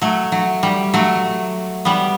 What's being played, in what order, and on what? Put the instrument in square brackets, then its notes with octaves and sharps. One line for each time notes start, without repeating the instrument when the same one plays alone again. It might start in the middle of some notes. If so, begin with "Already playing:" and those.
[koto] F#3 A3
F#3
G3
F#3 A3
G3 B3